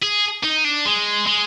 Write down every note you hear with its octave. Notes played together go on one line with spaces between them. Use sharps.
G#4
D#4
D4
G#3
G#3